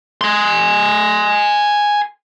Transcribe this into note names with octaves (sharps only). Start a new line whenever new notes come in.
G#5 C6